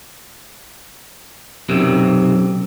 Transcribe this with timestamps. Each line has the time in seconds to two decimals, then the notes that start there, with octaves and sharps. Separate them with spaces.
1.69 B1 F#2 C3